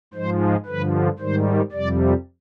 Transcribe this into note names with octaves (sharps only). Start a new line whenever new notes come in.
G#2 F3 G#3 C5
G2 D3 F3 B4
G#2 D#3 G3 C5
F2 C3 G3 D5